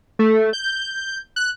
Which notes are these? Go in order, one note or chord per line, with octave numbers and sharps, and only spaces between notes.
A3
G6
F#6